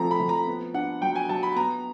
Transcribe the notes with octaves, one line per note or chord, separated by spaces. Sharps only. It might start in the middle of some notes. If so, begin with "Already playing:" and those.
Already playing: F3 A3 C4 A#5
B5
F3
A#5
B3
D4 F#5
F#3 G5
G#5
F#3 A5
B5
B3 A#5